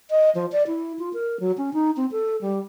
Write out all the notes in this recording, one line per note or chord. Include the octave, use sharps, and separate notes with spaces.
D#5
F3
D5
E4
F4
A#4
F#3
C#4
D#4
C4
A4
G3